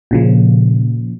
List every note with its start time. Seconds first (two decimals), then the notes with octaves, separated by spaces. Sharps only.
0.11 A#2 C#3 F3